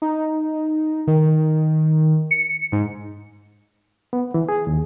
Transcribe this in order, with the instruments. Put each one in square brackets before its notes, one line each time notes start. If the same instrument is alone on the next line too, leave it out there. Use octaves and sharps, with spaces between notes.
[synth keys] D#4
D#3
C#7
G#2
[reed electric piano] B3
E3
G#4
D#2